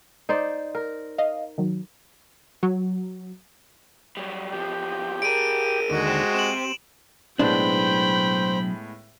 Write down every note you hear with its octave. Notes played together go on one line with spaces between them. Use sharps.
D#4 C5 D5
A#4
D#5 F5
D#3 F#3
F#3
F#3 G3
E2 F3 G4
G#4 A#4 D7 D#7
D#2 D3 G#3 F#4 D#7
G4 C5 E7
C4 E7 F#7
B1 A2 G#3 B3 D4 C5 G5 B5